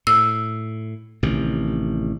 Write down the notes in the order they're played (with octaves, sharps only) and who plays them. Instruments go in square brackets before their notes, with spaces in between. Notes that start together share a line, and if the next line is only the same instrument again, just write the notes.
[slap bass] A2 [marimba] E6
[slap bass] A1 C3 D#3